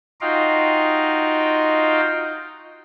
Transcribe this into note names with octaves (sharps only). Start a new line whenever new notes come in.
D#4 F4 F#4 D#5 F5 G5